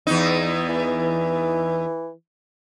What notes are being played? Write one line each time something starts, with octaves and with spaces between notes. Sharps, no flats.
E2 D#4
E3